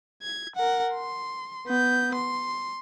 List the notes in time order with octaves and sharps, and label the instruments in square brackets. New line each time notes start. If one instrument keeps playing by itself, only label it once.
[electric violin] G#6
A#4 F#5
C6
B3 G6
C6